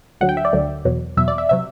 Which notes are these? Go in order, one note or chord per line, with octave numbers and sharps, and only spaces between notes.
D2 D3 F#3 F#5
G5
E5
D5
D2 D3 F#3
E2 B2 F#3
E2 B2 F#3 E5
D5
E5
C3 F#3 E5